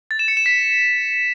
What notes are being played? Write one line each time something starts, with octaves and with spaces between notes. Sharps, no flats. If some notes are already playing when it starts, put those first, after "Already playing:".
A6
E7
C#7
E7
B6